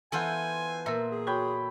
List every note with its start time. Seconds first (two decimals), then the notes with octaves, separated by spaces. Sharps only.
0.12 E3 B3 F4 A4 C5 F#5 G#5
0.86 A#2 A#3 A#4 E5
1.12 G#4
1.27 F#4 C#5 G5 B5